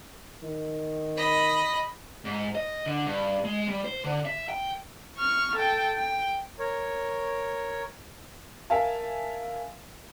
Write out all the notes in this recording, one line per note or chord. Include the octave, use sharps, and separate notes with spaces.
D#3
D#5 B5
G#2
D#5
D3
G2
G#3
G3
C5
D3
E5
G5
C#6 F6
A4 G5
G5
A#4 C#5
A#4 E5 F5 G#5 A5